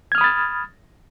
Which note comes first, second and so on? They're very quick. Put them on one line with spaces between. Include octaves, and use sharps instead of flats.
G#6 F6 D#6 B5 A6